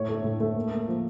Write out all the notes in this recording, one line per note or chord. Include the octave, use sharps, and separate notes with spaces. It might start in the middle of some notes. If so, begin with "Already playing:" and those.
Already playing: A2 C#5
A3
A2
A3
A#3
A#3
F3